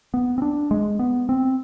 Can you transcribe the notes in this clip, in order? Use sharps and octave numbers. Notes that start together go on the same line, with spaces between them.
B3
C4
D4
G#3
B3
C4